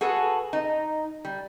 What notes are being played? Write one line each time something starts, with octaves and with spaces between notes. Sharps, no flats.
F#4 G#4 A4 B4
D#4
G3